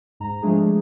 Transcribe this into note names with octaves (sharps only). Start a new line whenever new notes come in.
G#2 A#5
F3 G#3 A3 D4 G#4